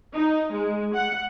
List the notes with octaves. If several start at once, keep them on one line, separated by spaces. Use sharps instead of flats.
D#4
G#3
F#5